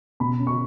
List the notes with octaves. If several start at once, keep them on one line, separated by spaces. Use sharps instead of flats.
B2 B5
C#4
C#6